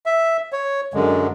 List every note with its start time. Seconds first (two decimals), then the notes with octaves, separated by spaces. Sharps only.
0.06 E5
0.53 C#5
0.94 F#2 D3 G#3